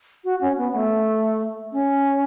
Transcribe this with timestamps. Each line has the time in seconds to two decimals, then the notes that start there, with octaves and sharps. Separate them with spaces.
0.24 F#4
0.41 C#4
0.57 B3
0.73 A3
1.72 C#4